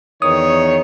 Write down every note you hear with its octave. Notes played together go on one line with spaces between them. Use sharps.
E2 D#3 C#5 D#6